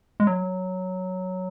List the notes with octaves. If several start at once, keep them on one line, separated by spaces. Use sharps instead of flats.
G#3
F#3